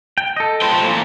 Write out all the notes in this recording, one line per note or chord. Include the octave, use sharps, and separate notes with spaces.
G5
A4 D#5
F4 B4 C5 G5
A3 G4
A#2 E3